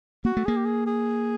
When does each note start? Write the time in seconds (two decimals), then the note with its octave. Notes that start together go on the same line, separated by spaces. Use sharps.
0.25 A#3 F#4
0.37 A3
0.46 A#3 G#4
0.57 G4
0.65 G#4
0.87 G#4